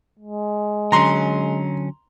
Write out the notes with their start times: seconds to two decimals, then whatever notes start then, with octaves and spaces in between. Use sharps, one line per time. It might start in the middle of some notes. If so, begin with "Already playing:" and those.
0.20 G#3
0.92 D3 F#3 C#4 A#5 C6